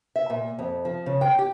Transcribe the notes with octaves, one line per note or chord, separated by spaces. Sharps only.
E5
A#2
F2
F3
C#3
G5
G4